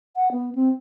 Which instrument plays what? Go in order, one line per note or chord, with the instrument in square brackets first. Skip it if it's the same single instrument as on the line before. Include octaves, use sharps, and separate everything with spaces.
[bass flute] F#5
B3
C4